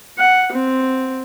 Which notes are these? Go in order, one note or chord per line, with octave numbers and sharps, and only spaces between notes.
F#5
C4